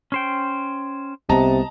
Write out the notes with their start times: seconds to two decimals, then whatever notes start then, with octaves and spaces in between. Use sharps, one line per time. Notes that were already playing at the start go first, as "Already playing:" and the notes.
0.12 C#4 C5 G5
1.29 C2 C3 B3 D#5 A5 A#5